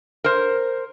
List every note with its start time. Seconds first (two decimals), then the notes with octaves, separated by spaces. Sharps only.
0.24 A#4 C5